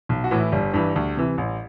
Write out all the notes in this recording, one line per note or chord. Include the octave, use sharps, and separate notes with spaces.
B1
F#4
A2 E3
E4
G1 G3
G2 E3 G3
D2
C3 E3
A1